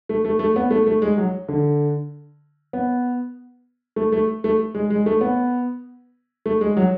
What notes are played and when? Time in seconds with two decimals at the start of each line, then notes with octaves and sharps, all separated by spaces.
0.09 A3
0.25 A3
0.39 A3
0.56 B3
0.71 A3
0.86 A3
1.02 G#3
1.18 F#3
1.49 D3
2.73 B3
3.96 A3
4.12 A3
4.44 A3
4.75 G#3
4.90 G#3
5.06 A3
5.21 B3
6.46 A3
6.61 G#3
6.77 F#3